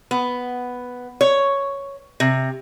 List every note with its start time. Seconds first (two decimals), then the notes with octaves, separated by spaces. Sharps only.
0.11 B3
1.21 C#5
2.20 C3